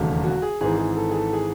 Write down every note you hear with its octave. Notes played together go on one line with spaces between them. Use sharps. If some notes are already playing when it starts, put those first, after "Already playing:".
Already playing: E1 D#2 C#3 F#3 A3
F#4
G#4
G#1 G#2 E3 G#4
G#4
A4
G#4
A4
G#4